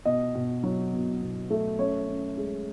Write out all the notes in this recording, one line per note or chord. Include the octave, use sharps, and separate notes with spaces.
B2 D#5
B2
F#3
B2
B2
A3
F#2 C#5
F#2
G#3